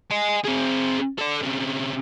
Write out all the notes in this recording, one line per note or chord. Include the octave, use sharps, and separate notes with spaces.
D#5 G#5
C4 G#4
A4 D5
C3 C#4